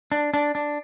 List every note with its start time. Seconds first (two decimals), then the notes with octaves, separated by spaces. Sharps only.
0.12 D4
0.34 D4
0.55 D4